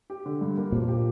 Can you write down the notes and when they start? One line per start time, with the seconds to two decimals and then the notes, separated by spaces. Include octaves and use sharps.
0.10 G4
0.25 D3
0.41 G2
0.58 A#3
0.72 A#2 F3
0.88 G4